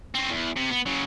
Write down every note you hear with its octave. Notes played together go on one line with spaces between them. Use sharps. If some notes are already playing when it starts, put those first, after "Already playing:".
C4 C#4
E2
C3
B3
C#3 F#3